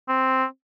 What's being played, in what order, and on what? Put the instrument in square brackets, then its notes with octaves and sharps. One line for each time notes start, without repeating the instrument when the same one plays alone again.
[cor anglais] C4